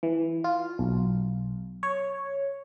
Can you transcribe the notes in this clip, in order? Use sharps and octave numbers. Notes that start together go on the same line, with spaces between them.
E3
F4
B1
C#5